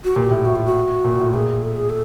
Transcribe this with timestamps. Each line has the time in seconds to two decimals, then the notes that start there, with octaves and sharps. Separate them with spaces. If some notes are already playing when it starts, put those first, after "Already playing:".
0.04 F#4
0.15 A#2 G4
0.31 A2
0.45 A2 F#4
0.56 F4
0.65 F#4
1.04 A#2
1.19 A2
1.33 A#2 G#4
1.63 A4
1.76 G#4
1.89 A4